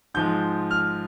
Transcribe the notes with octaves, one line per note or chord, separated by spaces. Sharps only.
G#2 F3 G#3 G6
F6